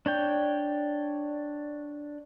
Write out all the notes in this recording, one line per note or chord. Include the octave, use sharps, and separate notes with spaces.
D4 C#5 G5